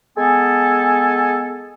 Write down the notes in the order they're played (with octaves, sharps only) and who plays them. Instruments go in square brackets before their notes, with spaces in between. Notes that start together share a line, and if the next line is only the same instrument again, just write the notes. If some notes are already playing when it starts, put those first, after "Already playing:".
[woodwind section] G#3 B3 A4 G#5